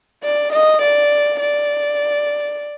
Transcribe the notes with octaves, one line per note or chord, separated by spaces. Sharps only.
D5
D#5
D5
D5